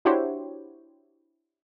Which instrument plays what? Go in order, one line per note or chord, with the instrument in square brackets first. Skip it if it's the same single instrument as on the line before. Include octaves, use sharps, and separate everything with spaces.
[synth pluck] D4 E4 F#4 G4 C5 C#5